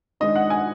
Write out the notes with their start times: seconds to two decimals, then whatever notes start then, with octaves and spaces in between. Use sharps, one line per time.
0.20 D#3 G#3 D4 D#5
0.36 F#5
0.50 G#5